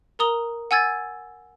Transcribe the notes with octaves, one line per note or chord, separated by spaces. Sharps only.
A#4 A#5 D#6 G7
F#5 G#5 E6 G#6 A6